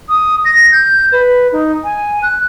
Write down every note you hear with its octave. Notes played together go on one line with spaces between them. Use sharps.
D#6
A#6
G6
B4
D#4
G#5
F#6